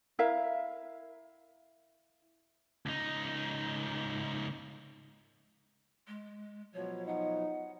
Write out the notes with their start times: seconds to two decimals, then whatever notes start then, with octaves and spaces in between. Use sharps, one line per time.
0.19 E4 A#4 E5 F5
2.86 C#2 D#4
6.08 G#3
6.74 B2 F3 F#3 C#5
7.07 D#4 F#5